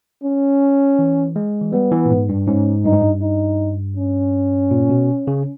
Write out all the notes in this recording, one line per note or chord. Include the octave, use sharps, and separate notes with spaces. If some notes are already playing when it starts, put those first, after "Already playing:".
C#4
E3
G#3
E3
G3 B3
E3
A#2
G#2
G2
G#2 C#4
G2 D#4
G#2
G2
D#4
C#4
A#2
B2
C#3